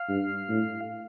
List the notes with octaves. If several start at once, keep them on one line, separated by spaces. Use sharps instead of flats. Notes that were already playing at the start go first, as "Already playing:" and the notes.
Already playing: F5
G2
A2